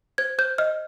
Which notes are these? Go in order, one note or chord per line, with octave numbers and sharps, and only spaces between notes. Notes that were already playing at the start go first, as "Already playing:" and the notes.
C5 G#6
C5 G6
D#5 F6